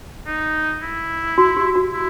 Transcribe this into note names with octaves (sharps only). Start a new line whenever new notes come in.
D#4
E4
F#4
G4
F#4
E4